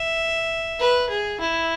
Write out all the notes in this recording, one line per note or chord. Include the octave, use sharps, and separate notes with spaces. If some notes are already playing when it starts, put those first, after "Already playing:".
Already playing: E5
B4
G#4
E4